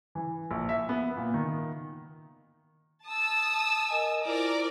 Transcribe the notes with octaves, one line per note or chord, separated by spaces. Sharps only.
E3
A#1
E5
B3
A#2
D#3
A5 D#6 E6
A#4 D#5 G#5
E4 F4 A#4 C5 D5 D6